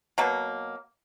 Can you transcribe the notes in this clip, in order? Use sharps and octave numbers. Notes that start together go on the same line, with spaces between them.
B2 F#3 A#3